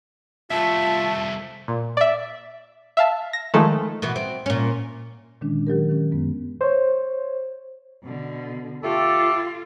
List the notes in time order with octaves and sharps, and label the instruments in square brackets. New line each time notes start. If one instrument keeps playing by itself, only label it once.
[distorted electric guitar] C2 A3 [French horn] F4 [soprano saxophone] E5 [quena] A5
[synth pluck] A#2
D5 E5
E5 F5 A5
A#6
D#3 F3 G#3 A3 A4
[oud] B2 E3 B3
C4
A#2 C#4
[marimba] A#2 D3 D#3 G#3 C#4 D4
D#3 F#3 G4 A#4
D#3 C#4
F#2 G#3 B3
[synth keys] C5 C#5
[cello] B2 D3
[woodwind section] A3 G4 A4 [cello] F4